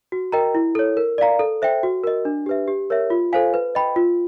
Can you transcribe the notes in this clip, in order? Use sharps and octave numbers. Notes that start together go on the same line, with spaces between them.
F#4
A#4 D#5 G5 A#5
E4
A4 C#5
A#4
D5 F5 A#5
A4
C5 E5 G5
F#4
A#4 D#5
D4
G4 B4 E5
G4
A#4 C#5 E5
F4
A4 C5 F5 G#5
B4
D#5 G5 B5
F4